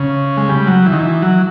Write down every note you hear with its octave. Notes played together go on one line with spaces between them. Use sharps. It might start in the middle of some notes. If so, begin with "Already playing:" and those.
Already playing: C#3
G#3
G3
F#3
E3
D#3
E3
F#3